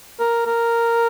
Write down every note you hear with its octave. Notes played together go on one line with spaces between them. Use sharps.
A#4
A#4